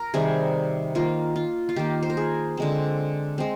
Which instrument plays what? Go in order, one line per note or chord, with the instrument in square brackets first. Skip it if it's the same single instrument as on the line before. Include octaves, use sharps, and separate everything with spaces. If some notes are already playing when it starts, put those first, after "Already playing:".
Already playing: [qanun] A#4
C3 D#3 G3 G#4
D#3 A#3 F4
F4
F4
D#3 A#3 G4
C5
A#4
G#4
D3 G#3 C4
G#3 C4